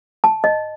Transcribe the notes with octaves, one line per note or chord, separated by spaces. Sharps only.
A5
D#5